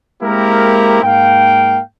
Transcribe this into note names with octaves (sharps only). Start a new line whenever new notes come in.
G#3 A#3 C4 E4 G4 A#4
G#2 A#3 F5 G5